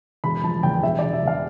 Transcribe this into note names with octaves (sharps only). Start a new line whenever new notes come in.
E1 B5
F3 A5
E2 G5
E1 E5
D5
E1
E5
E2 F5